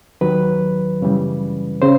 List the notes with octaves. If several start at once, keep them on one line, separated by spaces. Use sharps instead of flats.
D#2 D#3 F#3 B4
F#2 C#3 E3 G3
C#3 C5